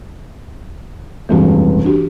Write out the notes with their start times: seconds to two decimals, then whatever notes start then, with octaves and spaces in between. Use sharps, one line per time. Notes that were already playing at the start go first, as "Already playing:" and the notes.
1.29 F1 C#2 G2 E3 C#4 F#4
1.85 D4 F#4 G4